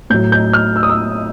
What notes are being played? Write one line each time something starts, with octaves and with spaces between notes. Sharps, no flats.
A2 F#3 G6
G6
F6
E6
D#6
E6